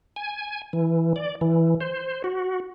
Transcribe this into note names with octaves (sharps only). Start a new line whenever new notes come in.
G#5
E3
D5
E3
C5
F#4